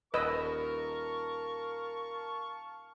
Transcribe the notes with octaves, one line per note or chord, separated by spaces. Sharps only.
D#1 A#4 B4 D#5 F5 A5 C#6 E6